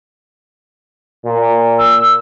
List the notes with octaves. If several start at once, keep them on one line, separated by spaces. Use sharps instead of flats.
A#2
E6